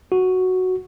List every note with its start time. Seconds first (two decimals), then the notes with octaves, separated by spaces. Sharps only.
0.12 F#4